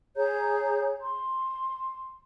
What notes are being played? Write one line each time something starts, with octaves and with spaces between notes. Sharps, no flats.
G#4 C#5 A#5 G6
C6